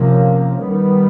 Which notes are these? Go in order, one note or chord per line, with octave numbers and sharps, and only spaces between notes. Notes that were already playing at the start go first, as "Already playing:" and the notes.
Already playing: C3 F3 A#3 C#4
D#3 G3 B3